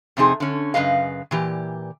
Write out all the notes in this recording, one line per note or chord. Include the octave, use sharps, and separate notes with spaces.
F2 C3 C4 D#4 G#4
D3 C#4
F#2 C#3 B4 D#5 F5
A#2 E3 G4